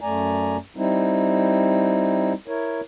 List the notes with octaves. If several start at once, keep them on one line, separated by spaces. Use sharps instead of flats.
F#2 A3 D5 G#5 A#5
G3 C4 D#4 E4
E4 A#4 C#5